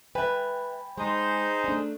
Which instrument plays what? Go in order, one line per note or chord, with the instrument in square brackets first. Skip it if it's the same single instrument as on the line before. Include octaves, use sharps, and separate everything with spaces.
[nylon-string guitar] B4 E5 [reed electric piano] G5 G#5 B5
[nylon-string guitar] G#3 [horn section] D#4 G#4 C5
[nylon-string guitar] A3 D4